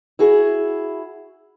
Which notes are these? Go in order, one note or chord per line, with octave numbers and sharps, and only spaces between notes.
E4 F#4 G#4